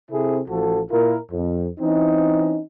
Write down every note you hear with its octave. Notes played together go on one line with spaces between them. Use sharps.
C3 C4 E4 G#4 A4
A1 F3 F#4 A4
A#2 E4 F4 A#4
F2
E3 C4 C#4 D#4